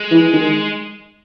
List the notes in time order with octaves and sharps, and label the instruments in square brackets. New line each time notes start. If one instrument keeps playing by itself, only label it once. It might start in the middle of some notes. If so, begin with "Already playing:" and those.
Already playing: [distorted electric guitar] G#3
[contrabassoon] E3
D#3